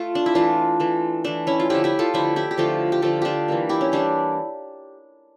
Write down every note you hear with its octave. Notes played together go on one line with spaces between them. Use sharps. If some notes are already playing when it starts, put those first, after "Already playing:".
Already playing: A3 F4
D4
E4
E3 A3 D4 F4
E3 A3
E3 A3 D4
C#4 E4
F4
D3 F3 A3 E4 G4
E4 G4
F4 A4
D3 F3 A3 E4 G4
E4 G4
G4
D3 F3 A3 F4 A4
G4
D3 F3 A3 F4 A4
D4 F4 G4
E3 G3 A#3
E4 G4
C#4
E3 G3 A#3 D4